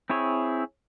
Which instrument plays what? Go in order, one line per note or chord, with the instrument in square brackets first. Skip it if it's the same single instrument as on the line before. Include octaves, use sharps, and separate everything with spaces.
[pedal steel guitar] C4 E4 G#4 C#5